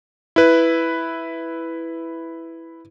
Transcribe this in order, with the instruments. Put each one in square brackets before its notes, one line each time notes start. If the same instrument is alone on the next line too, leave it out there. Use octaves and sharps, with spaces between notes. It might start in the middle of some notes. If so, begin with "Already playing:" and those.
[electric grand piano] E4 B4